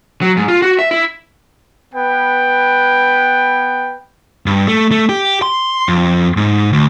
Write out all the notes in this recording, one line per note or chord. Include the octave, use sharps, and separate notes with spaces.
F#3
G#2
F4
F#4
E5
E4
B3 B4 G5
G2
A3
A3
G4
C6
F2
G#2
D2